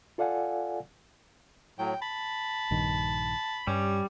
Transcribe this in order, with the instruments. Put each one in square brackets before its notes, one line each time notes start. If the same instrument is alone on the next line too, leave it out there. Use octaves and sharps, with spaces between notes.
[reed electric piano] F4 A4 D5 F5 F#5 G#5
[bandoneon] A2 F#3 [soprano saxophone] G5
[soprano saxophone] A5 [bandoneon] B5
[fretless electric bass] A#1 G2 D#3
[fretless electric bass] G2 [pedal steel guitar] G3 [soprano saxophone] C#4